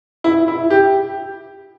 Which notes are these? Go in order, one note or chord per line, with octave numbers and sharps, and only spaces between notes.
E4
E4
G4